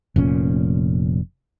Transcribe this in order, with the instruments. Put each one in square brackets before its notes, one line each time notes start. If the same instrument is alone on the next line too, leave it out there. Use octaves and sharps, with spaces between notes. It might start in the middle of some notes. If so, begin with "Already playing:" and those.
[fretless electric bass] F1 A#2 C#4